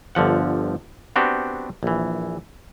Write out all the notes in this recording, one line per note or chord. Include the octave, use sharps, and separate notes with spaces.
G1 D3 F3 F#5
B3 C4 D4 F#4 G4
A#1 E3